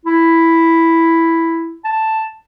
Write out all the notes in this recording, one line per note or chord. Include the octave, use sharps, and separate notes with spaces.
E4
A5